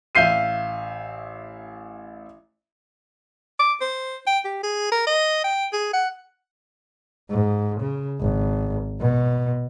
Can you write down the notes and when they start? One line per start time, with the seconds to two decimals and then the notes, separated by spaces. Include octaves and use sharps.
0.15 A1 E5 F5 G6 C7 D#7
3.59 D6
3.81 C5
4.27 G5
4.45 G4
4.63 G#4
4.92 A#4
5.07 D#5
5.44 G5
5.73 G#4
5.94 F#5
7.30 G#2
7.80 C#3
8.20 G#1
9.00 B2